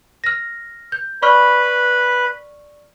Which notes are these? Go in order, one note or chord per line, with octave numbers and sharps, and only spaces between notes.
F6 A#6
G6
B4 D5 B5 C#6 F6